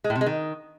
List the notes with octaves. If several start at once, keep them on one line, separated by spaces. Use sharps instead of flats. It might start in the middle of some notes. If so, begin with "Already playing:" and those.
G#3
A2
C3
G#3
D#3